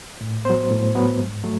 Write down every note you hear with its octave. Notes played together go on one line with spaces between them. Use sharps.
A2
F#3 B3 C5
A2
F#3 B3
G#2
F#3 A3